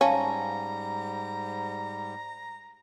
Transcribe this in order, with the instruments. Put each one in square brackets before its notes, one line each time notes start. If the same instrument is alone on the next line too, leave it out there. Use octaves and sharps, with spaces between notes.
[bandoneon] G#2 G3 [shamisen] C#4 [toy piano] F5 G5 A5 [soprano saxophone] A#5